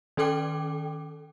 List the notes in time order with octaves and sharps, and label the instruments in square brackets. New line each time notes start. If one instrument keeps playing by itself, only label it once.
[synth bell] D#3 C#4 A4 G5 D6